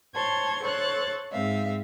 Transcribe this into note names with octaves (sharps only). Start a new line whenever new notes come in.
C5 C#5 A5 C6 G#6
A4 C5 C#5 C#6 F#6 A6
G#2 G#3 C4 E5 F5